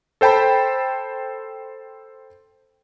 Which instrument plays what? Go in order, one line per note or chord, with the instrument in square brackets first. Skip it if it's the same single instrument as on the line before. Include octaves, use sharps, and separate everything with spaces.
[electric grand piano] A4 C5 G5 A5 B5